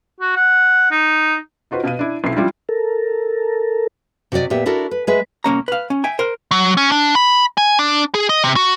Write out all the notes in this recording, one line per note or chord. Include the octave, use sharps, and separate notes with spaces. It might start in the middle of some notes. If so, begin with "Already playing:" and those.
F#4
F#5
D#4
D#4 F4 F#4 B4 C5
B2 B4 F5 D#7
D4 E4
B1 C4 E4 C7
F3 G3 D4 E4 F4 G4
A4 A#4
C3 F#4 G#4 D5 D#5
A#2 B3 G4 E5
D4 E4 F#4 A4 A#4
B4
G#3 G#4 B4 E5
C2 A#3 C#4 A#5
B4 F5
C#4
E5 G5 G#5
A#4 C5
F#3
C#4
D4
B5
G#5
D4
G#4
D#5
C3
F#4